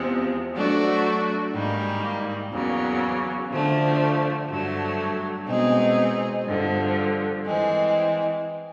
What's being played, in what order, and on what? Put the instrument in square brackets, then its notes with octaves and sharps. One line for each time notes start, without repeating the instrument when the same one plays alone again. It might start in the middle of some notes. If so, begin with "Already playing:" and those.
Already playing: [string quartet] E2 C3 F3 G#3
F#3 A3 D4 F#4
G#2 D#3 G3 A#3
E2 C#3 F#3 A#3
D3 F3 A3
G2 D3 F#3 A3
B2 G#3 C4 D#4 G#4
G2 D3 F3
E3 G#3 C4